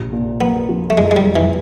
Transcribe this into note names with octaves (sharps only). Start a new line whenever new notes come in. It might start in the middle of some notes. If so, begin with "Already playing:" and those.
Already playing: A#1 C3
A#2
A#3 B3
F3
A3
F#1 G#3
G#3
G3
F2
E3